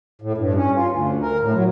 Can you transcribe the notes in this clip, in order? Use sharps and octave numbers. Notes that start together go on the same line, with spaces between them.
A2
G2
C#4
F4
D2
A#4
A2
F#3